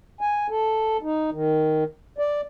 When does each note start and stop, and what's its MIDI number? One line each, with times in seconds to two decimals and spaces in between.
0.21 0.47 80
0.50 0.97 69
1.02 1.30 63
1.32 1.84 51
2.18 2.41 74